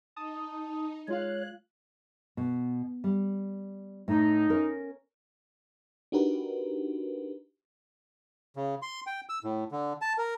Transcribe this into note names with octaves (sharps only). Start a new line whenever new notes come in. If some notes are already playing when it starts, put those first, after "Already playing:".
D#4 A5 D#6
G#3 F4 C#5 F5 F#6
B2
G3
A2 D#4
C#4 A#4
D4 D#4 F#4 G4 A#4 B4
C#3
C6
G5
E6
A2
D3
A5
A#4